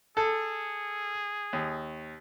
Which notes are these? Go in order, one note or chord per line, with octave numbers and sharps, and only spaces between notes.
G#4 A4
D#2